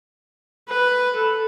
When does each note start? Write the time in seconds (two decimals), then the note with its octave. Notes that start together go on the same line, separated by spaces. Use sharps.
0.68 B4
1.16 A4